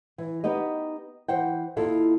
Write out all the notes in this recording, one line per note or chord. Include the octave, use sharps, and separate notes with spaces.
E3
B3 D#4 G4 D#5
E3 C5 F#5 G5
D#2 E4 F4 A4